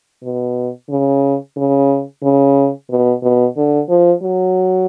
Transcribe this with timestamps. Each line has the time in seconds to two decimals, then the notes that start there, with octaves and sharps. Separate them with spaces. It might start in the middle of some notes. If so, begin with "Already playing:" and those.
0.23 B2
0.90 C#3
1.57 C#3
2.23 C#3
2.90 B2
3.23 B2
3.57 D3
3.89 F3
4.23 F#3